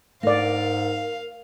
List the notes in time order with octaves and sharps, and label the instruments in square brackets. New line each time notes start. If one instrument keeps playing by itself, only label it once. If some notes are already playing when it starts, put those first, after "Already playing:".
[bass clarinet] G#2 [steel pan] A3 D5 [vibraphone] A#4 [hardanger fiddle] F5